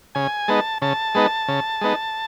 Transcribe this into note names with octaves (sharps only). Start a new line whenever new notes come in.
C#3 G#5
G#3 B3 D#4 A5
C#3 A5
G#3 B3 D#4
C#3
G#3 B3 D#4